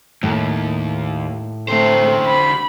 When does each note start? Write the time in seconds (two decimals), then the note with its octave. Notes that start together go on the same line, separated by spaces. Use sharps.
0.23 D#2 A2
1.68 D3 A3 C4 C5
2.26 B5